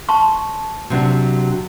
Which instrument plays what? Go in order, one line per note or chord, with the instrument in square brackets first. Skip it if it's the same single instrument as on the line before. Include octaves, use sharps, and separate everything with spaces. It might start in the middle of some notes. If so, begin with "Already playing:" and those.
[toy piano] A5 C6 C#6
[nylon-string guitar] C3 F#3 D4